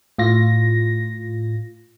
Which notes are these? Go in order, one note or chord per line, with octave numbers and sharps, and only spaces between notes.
A2 F4 A#6